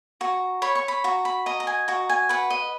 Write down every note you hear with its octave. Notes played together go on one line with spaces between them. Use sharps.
F#4 A#5
C#5 B5
C#6
B5
F#4 A#5
B5
D#5 A#5
A#5
G#5
F#4 A#5
G#5
B4 F#5
D#5